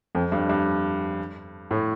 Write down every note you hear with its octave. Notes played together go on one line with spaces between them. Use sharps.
F2
G2
G2
A2